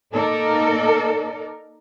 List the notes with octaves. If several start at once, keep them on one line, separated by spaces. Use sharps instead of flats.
A#3 D#4 A4 A#4 D5